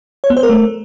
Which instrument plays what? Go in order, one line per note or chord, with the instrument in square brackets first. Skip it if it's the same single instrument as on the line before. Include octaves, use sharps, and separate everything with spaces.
[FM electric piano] C#5
B3
C5
A#4
A3